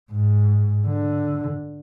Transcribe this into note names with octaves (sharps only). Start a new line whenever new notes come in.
G#2
D3